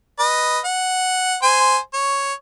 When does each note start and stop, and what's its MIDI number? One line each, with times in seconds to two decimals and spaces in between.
0.19 0.59 71
0.19 0.59 75
0.65 1.37 78
1.43 1.78 72
1.43 1.78 80
1.94 2.33 73